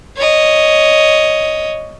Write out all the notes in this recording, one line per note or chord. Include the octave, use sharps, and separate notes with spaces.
C#5 D#5